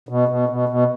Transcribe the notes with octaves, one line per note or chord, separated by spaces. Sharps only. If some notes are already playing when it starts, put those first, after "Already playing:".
B2
B2
B2
B2